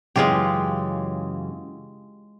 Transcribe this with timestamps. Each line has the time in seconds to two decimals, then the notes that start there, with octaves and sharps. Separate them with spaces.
0.16 F#2 C#3 E3 G#3 F4 G4